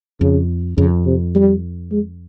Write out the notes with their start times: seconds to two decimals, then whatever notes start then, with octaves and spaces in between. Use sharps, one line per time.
0.21 F2 C#3
0.77 F2 C#3
1.06 C3
1.35 G3
1.92 G#3